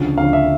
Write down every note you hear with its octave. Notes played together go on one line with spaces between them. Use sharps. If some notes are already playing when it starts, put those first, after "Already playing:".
Already playing: D2 C#3 F3
D2 C#3 F3 F5
E5